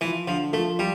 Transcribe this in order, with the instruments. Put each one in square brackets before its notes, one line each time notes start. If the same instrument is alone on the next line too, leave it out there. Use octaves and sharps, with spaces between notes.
[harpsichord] E3 [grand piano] F3
[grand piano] D3 [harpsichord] F3
[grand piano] F3 [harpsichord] A3
[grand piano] F3 [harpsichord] G3